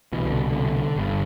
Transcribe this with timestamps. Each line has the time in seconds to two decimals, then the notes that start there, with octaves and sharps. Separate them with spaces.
0.12 C2 B2 E3
0.26 D3
0.50 D3
0.96 G1 G2 D3